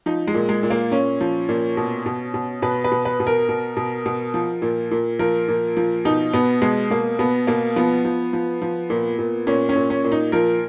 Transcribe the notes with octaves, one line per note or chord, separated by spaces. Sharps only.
F3 D#4
G#3
A#2
G#3
A#2
A#3
A#2 C#4
F3
A#2
B2
B2
B2
B2 B4
B4
B2
B4
B2
A#4
B2
B2
B2
F3
A#2
A#2
F3 A#4
A#2
F3
B2 D#4
B2 B3
B2 G#3
B2 A#3
B2 B3
B2 A#3
F3 B3
F3
F3
F3
A#2
A#2
A#2 C#4
C#4
A#2
C#4
A#2
D#4
F3 A#4